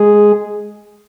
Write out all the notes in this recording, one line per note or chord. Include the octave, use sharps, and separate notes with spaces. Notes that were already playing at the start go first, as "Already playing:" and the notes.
Already playing: G#3 G#4